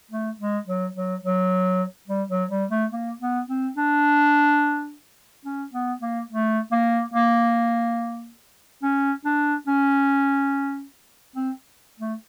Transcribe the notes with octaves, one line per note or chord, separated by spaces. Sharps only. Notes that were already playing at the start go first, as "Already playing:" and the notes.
A3
G#3
F#3
F#3
F#3
G3
F#3
G3
A3
A#3
B3
C4
D4
C#4
B3
A#3
A3
A#3
A#3
C#4
D4
C#4
C4
A3